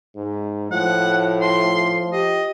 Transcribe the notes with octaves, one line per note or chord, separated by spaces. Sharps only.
G#2
A2 F3 F#5
C6
G4 D#5